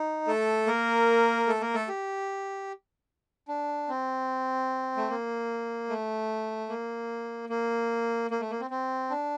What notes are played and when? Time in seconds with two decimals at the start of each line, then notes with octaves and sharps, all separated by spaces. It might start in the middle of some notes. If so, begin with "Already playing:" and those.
Already playing: D#4
0.27 A3 A4
0.67 A#3 A#4
1.48 A3 A4
1.61 A#3 A#4
1.74 A3 A4
1.88 G4
3.48 D4
3.89 C4
4.97 A3
5.10 A#3
5.89 A3
6.69 A#3
7.49 A#3
8.31 A#3
8.41 A3
8.50 A#3
8.60 C4
8.70 C4
9.10 D4